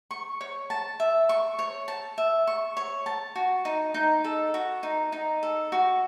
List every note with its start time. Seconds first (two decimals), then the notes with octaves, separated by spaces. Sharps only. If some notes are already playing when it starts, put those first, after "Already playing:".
0.11 C#6
0.41 C#5
0.70 A5
1.00 E5
1.29 C#6
1.59 C#5
1.88 A5
2.18 E5
2.47 C#6
2.77 C#5
3.06 A5
3.35 F#4
3.65 D#4
3.94 D#4
4.24 A4
4.54 F#4
4.83 D#4
5.12 D#4
5.43 A4
5.72 F#4